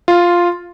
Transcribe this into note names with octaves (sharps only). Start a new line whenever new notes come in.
F4